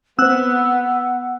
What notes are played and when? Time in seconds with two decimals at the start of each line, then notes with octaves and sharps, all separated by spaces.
0.19 B3 C4 C5 F#5 E6 F#6